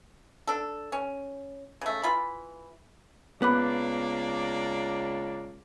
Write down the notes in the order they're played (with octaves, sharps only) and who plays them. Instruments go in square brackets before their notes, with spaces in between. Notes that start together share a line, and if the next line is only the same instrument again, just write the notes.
[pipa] D4 A4
C#4
C#3 A3
E3 F4 B5
[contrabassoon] C#2 [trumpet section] A#3 D4 D5 [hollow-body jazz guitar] B3 [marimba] B5 D6 F#6